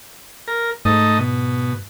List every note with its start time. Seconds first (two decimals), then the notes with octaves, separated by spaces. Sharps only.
0.48 A#4
0.85 G#2 A3 D#4 D#5
1.19 B2